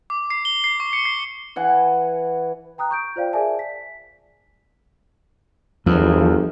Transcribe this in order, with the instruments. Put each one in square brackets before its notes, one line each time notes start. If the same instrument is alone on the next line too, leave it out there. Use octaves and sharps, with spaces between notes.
[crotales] D6
C7
G7
C7
C#6
C#7
C7
[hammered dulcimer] E3 F#5 G#5
[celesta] G5 A#5 D#6 F#6
C#6 G6 D7
F4 C5 D5 F5 G5
G#4 A#4 D5 E5 G#5 A5
B6
[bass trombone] G1 [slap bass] E2 [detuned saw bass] F3